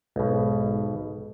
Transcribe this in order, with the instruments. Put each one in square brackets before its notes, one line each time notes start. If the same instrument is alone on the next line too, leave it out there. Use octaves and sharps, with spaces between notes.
[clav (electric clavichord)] B1 B2 [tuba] G#2